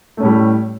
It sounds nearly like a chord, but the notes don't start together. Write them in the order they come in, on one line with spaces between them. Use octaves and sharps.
A3 C#4 A2 G3